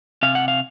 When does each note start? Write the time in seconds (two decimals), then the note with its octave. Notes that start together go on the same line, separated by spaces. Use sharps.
0.23 C3 F5
0.35 F#5
0.48 F5